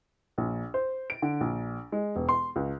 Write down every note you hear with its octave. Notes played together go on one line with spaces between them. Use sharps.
A#1
C5
D7
D3
A#1
G#3
E1
C6
C#2